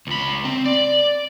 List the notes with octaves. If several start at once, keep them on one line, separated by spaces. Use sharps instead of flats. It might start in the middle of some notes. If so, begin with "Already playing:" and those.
C#2 B5
C4
D5